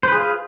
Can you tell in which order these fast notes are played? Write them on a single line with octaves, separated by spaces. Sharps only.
C5 B4 G#4 F4